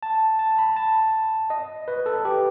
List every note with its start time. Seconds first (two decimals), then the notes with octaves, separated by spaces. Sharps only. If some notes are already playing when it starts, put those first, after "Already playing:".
0.03 A5
0.39 A5
0.58 B5
0.76 A5
1.50 D#5
1.88 B4
2.06 A4
2.25 G4